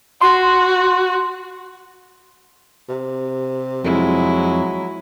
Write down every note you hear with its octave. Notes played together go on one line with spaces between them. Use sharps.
F#4 C6
C3
F2 F#3 G#3 E4